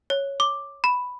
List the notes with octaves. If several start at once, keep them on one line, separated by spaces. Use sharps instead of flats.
C#5
D6
B5